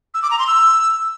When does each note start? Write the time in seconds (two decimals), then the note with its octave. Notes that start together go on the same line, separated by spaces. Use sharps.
0.14 E6
0.22 D6
0.31 A#5
0.39 C6
0.47 E6